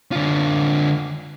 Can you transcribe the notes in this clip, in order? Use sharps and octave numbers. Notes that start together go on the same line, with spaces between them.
D3 F4